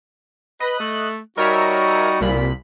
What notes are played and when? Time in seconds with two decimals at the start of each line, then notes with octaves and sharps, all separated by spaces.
0.60 B4 D#5 F#6
0.78 A3
1.38 G3 D#4 F#4 A#4 C#5 E5
2.21 C2 A#2 B5